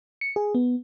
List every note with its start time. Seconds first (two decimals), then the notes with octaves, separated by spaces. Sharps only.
0.21 C#7
0.36 G#4
0.55 B3